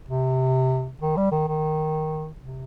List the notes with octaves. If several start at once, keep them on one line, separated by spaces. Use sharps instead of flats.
C3
D#3
G3
D#3
D#3
C3